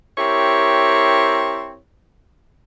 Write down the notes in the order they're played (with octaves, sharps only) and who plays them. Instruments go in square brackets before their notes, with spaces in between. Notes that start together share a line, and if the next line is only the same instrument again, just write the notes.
[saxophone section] C4 E4 G4 A#4 C#5